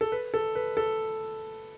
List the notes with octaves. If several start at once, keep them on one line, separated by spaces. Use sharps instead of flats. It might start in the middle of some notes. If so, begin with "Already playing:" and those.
A4
B4
A4
B4
A4